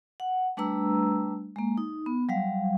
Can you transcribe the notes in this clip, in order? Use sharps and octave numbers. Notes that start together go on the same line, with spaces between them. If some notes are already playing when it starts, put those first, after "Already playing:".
F#5
G3 A3 D4 B4 A#5 E6
G#3 A#3
D#4
B3
F#3 G3 F5